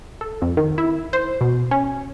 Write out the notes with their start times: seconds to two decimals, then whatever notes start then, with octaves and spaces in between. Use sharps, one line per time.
0.21 A4
0.42 F2
0.57 D#3
0.78 E4
1.13 C5
1.41 B2
1.71 C#4